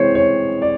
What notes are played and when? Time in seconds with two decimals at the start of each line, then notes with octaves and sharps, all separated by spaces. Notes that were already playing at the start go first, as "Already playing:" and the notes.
Already playing: C3 E3 G#3 C5 C#5
0.15 C#5
0.62 D5